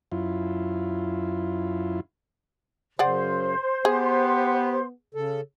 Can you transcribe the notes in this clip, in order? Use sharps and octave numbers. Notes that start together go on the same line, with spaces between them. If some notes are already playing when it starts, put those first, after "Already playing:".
F#2 E4 F4
F#2 C#3 G#4 C5 D5 F#5 C6
B3 G4 G#4
C#3 A4